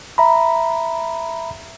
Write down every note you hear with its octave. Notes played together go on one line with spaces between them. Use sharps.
E5 A#5 B5